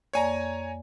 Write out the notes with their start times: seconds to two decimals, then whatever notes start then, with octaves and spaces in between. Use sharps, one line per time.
0.13 F2 A#3 C#5 D5 G#5 A#5